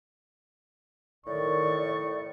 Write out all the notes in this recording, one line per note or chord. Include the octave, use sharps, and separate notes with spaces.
A2 D#3 D5 C#6